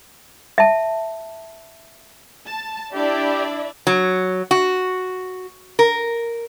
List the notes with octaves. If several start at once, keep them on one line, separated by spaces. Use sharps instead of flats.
E5 A5
A5
D4 E4 G4 D5 E5
F#3
F#4
A#4